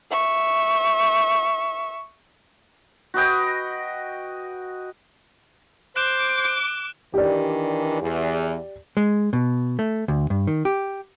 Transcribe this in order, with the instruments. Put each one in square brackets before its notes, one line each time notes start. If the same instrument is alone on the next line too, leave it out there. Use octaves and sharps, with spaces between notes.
[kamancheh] E5 C#6
[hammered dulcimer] F#4 B4 D#5 G5
[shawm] C5 [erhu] D6 [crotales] F#6 E7 G7
[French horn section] D#3 E3 D4 [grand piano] G4 D5
[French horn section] E2
[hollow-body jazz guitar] G#3
B2
A3
D2
G2
D#3
G4